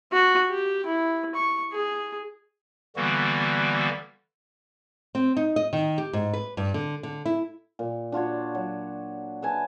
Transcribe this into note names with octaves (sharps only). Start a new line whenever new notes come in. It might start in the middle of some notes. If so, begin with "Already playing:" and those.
F#4
G4
E4
C#6
G#4
D3 E3 G3 A#3 B3 F#4
C4
D#4
D#5
D#3
G4
G#2
B4
G2
D3
D3
E4
A#2
D4 F4 F#4 C#5
F#3
B4 E5 G#5 A5